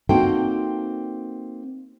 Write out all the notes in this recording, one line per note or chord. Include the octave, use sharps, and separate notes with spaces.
A#3 C4 D#4 F#4 A4 G5